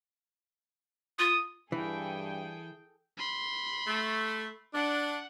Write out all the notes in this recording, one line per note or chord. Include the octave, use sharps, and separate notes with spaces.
F4 D#6
G2 E3 G#4 A4 G5
B5 C6
A3
D4 F#5